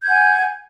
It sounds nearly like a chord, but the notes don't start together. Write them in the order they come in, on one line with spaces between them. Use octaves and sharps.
G6 G#6 F#5 G#5